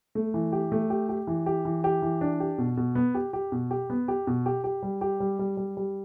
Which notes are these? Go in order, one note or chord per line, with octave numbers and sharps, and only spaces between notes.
A3
E3
G4
A3
G4
G4
E3
G4
E3
G4
E3
D4
G4
B2
B2
B3
G4
G4
B2
G4
B3
G4
B2
G4
G4
G3
G4
G3
G3
G3
G3